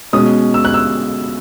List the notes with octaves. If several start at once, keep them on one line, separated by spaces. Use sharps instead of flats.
B2 G#3 C#4 D#6
E6
F#6
E6